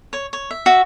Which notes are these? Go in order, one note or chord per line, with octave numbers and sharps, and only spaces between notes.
C#5
C#5
E5
F#4 E5